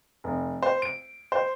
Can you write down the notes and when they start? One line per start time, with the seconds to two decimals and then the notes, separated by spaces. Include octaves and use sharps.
0.24 F1
0.63 C5
0.82 D7
1.32 C5